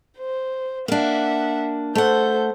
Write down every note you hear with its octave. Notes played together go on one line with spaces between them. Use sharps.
C5
A#3 D4 E5 F#5
A3 A4 C5 F#5 G6